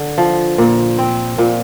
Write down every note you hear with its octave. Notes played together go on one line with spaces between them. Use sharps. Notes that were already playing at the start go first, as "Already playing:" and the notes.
Already playing: D3
F3
A#2
C4
A#2